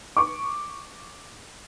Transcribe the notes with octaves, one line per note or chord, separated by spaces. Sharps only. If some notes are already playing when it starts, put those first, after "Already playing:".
C#6 D6